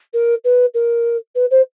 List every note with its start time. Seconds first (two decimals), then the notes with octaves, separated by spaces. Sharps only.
0.13 A#4
0.44 B4
0.74 A#4
1.35 B4
1.50 C5